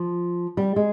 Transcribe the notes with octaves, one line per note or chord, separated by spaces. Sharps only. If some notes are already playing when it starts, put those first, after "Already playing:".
Already playing: F3
G3
G#3